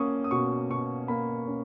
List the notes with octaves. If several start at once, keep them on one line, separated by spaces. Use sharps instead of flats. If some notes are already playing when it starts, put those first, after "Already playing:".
Already playing: A#3 C#4 C#6 D#6
D#6
B2 C#6
B2 C#6
A#3 B5
C#4